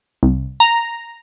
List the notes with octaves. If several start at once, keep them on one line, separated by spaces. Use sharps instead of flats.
C2
A#5